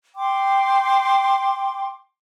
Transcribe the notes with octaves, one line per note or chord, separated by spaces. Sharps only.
G5 C6 D6